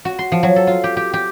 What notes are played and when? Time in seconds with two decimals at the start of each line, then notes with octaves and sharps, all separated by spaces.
0.05 F#4
0.19 C6
0.32 F3
0.43 F#3
0.56 A4
0.67 F4
0.84 G4
0.97 G4
1.13 G4